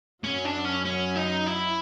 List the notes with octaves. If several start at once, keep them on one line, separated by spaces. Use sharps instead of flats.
F#2 F#3 C#4
D4
C#4
C#4
D#4
E4